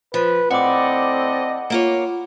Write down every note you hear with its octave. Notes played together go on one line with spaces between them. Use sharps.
F3 B4
A2 C4 A4 D5 D#5 F#5 B5 D6
A#3 F4 C#5